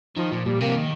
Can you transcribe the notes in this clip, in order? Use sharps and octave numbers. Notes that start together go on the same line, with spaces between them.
D#3 F3
A#2 F3
A#2 G3
C3 A#3
F3
D#3